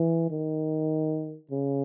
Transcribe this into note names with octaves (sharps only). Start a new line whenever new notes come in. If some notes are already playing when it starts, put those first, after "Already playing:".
Already playing: E3
D#3
C#3